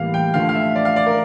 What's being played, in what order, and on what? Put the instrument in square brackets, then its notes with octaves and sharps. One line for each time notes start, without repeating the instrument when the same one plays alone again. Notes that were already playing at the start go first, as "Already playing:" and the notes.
Already playing: [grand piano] A2 E3 G3 A#3 F5
G5
D3 F3 A3 F5
F5
E5
D5
F5
D5
A#4